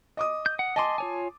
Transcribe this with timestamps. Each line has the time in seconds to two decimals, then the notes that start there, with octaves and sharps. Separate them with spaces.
0.17 D#5 D6 D#6
0.46 G6
0.59 F#5
0.76 D#5 G#5 A5 C6 D6
0.98 F4 C#5 G#5